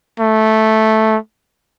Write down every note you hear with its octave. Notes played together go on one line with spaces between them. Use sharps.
A3